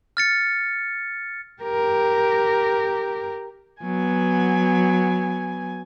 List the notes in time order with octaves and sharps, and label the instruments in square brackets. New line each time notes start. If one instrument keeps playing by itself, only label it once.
[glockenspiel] F6 A6 C#7
[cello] G4 A#4
[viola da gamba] F#3 B3 [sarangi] G#5